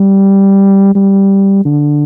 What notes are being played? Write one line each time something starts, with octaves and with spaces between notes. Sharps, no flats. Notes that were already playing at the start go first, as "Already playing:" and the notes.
Already playing: G3
G3
D3